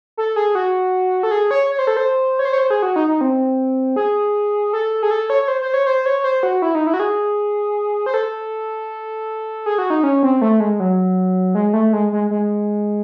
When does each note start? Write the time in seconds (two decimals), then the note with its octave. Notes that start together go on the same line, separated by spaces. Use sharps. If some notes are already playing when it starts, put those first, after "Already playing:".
0.17 A4
0.36 G#4
0.55 F#4
1.23 A4
1.31 G#4
1.51 C#5
1.70 C#5
1.79 C5
1.87 A4
1.97 C5
2.39 C#5
2.45 C5
2.53 C#5
2.58 C5
2.70 G#4
2.83 F#4
2.96 D#4
3.08 D#4
3.21 C4
3.96 G#4
4.73 A4
5.03 G#4
5.11 A4
5.30 C#5
5.42 C#5
5.48 C5
5.61 C5
5.74 C#5
5.86 C5
6.06 C#5
6.24 C5
6.43 F#4
6.62 E4
6.75 D#4
6.87 E4
6.94 F#4
7.00 G#4
8.06 C5
8.14 A4
9.66 G#4
9.78 F#4
9.90 D#4
10.03 C#4
10.23 C4
10.42 A3
10.60 G#3
10.80 F#3
11.55 G#3
11.73 A3
11.93 G#3
12.12 G#3
12.31 G#3